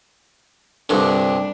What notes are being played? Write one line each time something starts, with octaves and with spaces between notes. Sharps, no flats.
C2 G2 D3 G3 D4